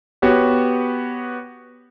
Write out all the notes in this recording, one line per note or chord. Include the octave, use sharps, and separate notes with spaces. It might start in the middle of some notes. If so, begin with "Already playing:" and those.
B3 F#4 G4 C#5